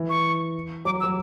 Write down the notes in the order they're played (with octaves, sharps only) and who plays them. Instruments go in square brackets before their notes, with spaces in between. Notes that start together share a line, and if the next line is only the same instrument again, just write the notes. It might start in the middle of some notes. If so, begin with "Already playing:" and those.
Already playing: [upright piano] E3
[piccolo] C#6
[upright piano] F#3 [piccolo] D6
[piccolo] E6
[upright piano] F#3